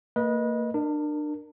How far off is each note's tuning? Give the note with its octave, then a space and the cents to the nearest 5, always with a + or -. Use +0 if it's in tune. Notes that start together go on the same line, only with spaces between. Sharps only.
A#3 -30 B4 -25 D#5 +0
D4 +30 A#4 +0